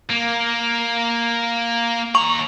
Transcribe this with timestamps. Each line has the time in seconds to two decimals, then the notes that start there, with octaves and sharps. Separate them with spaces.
0.10 A#3
2.15 D#2 A#5 C#6